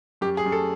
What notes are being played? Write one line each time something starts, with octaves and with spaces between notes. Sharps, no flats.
F#2 G4
G#4
F#2
A4